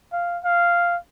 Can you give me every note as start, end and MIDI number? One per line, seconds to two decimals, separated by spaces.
0.12 0.38 77
0.44 0.97 77